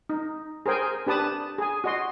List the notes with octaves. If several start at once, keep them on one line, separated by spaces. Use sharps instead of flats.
D#4
G#4 A#4 C5 G5 G#5
D4 G4 B4 A5 D#6
G#4 G#5
F#4 D#5 C6